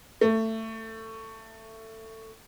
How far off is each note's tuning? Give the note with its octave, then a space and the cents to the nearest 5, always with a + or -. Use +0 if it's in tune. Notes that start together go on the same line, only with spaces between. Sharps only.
A3 +20